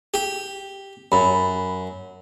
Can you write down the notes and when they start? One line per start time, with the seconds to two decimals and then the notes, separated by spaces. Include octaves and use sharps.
0.14 G4
1.12 F#2 B5